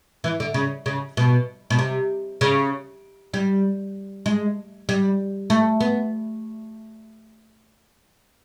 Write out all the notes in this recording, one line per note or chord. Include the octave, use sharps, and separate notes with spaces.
E3
D3
C#3
C#3
B2
B2
C3
C#3
G3
G#3
G3
A3
B3